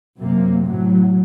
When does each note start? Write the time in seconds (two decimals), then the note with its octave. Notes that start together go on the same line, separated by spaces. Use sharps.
0.19 F#2 C3 A#3
0.63 A2 F#3